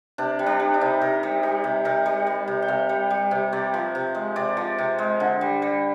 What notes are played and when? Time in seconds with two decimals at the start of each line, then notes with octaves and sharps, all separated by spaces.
0.18 C3 D4
0.39 G3
0.46 D4
0.60 G3
0.74 D#4
0.81 C3
1.01 C3 A#4
1.23 G3
1.43 G3
1.64 C3
1.85 C3 A#4
2.06 G3
2.27 G3
2.48 C3
2.62 G5
2.68 C3 F5
2.89 G3
3.10 G3
3.31 C3
3.53 C3 D5
3.74 F3
3.95 C3
4.15 G#3
4.36 C3 D5
4.57 F3
4.79 C3
4.99 G#3
5.20 D3
5.41 G3
5.62 G3